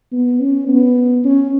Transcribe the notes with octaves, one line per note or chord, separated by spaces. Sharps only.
B3
C#4
B3
C#4